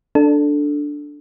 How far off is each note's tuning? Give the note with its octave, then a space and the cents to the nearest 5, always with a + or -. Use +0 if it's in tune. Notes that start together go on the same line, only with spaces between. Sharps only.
D4 +0 A4 +0